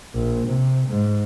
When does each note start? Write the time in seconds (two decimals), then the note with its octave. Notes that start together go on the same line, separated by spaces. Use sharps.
0.14 A#1
0.47 C3
0.87 G#2